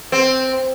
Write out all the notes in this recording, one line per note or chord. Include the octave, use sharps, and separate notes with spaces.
C4